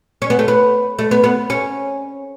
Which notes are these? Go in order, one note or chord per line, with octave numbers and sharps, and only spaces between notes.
C#4
B3
A3
B3
A3
B3
B3
C#4